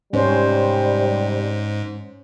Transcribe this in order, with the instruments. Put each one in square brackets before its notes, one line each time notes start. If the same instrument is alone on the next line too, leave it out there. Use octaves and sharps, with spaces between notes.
[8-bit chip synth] G#2 [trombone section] C3 G3 [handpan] C#4 C5